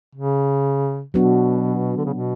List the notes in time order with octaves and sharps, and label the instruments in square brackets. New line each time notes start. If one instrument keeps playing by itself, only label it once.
[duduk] C#3
[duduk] B2 [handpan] F#3 B3 D4 F#4
[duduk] D3
C#3
B2